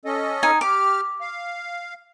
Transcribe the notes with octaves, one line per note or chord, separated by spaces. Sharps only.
C#4 A4 D#5
D#4 G#5
G4 D6 F6
F5